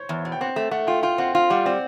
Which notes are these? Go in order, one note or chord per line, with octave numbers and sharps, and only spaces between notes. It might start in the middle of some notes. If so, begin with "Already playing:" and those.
Already playing: C5 C#5
E2
B2
G5
C4 F#5
A3
A3 F#5
F4 G5
F4 G5
C4 F#5
F4 F5
G3 F#5
C4 D5